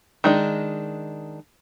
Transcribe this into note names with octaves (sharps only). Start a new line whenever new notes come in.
D#3 G#3 D4